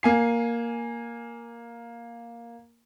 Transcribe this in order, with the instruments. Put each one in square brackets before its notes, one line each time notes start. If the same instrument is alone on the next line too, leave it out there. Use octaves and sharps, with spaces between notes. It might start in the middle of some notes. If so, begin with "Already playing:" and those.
[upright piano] A#3 G#5 C7